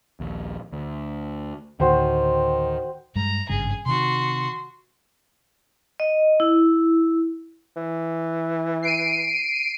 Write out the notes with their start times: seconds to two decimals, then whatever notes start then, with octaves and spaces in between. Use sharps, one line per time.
0.20 A#1 D#2
0.72 D2
1.80 D2 A2 D#3 F#4 C5 G5
3.15 G2 G3 G#3 A#5
3.49 G#1 G2 C#3 G#4
3.86 C3 D#3 F#4 C6
6.00 D#5
6.40 E4
7.77 E3
8.83 C7 D7 D#7